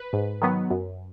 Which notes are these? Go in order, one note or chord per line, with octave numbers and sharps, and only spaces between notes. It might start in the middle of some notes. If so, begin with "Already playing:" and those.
Already playing: B4
G#2
D#3 F#3 B3
F#2